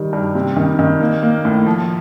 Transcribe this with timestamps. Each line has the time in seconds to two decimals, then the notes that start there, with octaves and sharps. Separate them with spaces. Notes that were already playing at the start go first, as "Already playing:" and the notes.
Already playing: D#3 G3
0.13 G2
0.35 C3
0.57 D#3
0.79 D#3
1.01 A#3
1.23 A#3
1.45 A2
1.66 F3